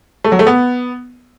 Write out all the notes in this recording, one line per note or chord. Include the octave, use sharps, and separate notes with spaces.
A3
F#3
A3
B3